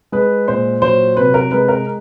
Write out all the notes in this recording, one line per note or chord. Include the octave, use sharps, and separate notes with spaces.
G#3 B4
A#2 C5
F#3 C5
C3 B4
A#4
G#3 B4
A#4